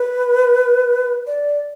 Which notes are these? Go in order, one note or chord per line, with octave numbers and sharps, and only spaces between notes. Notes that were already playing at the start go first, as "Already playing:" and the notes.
Already playing: B4
D5